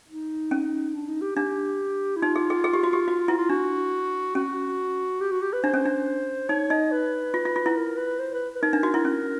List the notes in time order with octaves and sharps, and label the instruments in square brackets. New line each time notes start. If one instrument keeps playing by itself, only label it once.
[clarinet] D#4
[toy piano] C#4
[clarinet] D4
D#4
G4
[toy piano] D4 [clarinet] G4
[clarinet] E4
[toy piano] D#4 [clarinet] F4
[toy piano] G#4
G#4
G#4
G4
F#4
G4
F#4
E4
[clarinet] F4
[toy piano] D4 [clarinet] F#4
[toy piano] C#4 [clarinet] F#4
[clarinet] G4
F#4
G4
B4
[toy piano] D4 [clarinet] C5
[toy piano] C#4
D4
[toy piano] D#4 [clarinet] C#5
[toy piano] D#4 [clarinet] D#5
[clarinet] B4
[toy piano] F4
F4
F4
E4
[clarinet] A#4
B4
C5
B4
B4
[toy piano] D#4 [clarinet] A#4
[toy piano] D4
F#4
E4
C#4